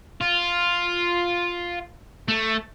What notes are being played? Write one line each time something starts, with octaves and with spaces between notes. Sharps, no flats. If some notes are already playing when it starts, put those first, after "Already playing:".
F4
A3